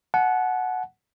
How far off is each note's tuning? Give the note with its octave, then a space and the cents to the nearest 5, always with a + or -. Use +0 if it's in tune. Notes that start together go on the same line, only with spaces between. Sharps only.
F#5 -5 A5 -40